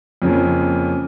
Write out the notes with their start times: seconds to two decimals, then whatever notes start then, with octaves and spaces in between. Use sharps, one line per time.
0.22 F2 C#3 F3 A#3